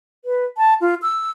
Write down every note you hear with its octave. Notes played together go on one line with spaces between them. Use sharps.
B4
A5
F4
E6